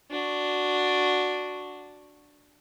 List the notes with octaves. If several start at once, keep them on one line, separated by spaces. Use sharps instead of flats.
D4 F#4